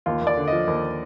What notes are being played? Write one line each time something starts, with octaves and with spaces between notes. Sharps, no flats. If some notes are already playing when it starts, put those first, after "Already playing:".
D#2 F4
D#2
D5
D3
F3 D#5
D#2